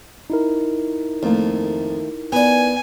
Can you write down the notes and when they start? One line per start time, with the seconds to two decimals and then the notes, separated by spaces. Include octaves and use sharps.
0.30 D#4 E4 A#4
1.23 F2 D#3 A3 A#3
2.32 B3 B4 D5 G#5